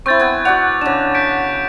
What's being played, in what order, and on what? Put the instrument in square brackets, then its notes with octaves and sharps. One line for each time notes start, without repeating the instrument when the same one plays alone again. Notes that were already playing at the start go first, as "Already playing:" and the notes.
[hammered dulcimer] C4 E4 [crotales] C#6 G6 A6
[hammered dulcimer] B3 G#5
[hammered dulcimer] F#4 D5 F#5 [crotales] F7
[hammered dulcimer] C#3 D4 [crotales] E7
[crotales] G6 B6 D7